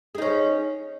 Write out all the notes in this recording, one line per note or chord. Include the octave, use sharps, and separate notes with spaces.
C#4 D#4 G#4